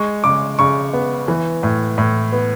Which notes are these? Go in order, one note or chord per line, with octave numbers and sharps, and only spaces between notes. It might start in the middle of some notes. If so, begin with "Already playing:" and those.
Already playing: G#3 C#6
C#3 D6
C#3 C#6
B3
E3
A2
A2
B3